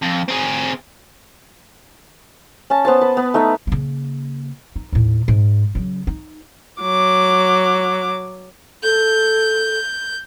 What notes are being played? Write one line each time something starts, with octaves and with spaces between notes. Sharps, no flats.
F2
C4 G#4
C#4 A5
B3 C5 A5
B4
B3
A3 D#4 E5
C#3 A#3
D#4
D#2 A2
G#2
C#3 F#3
D#4
F#3 D6
A4 G6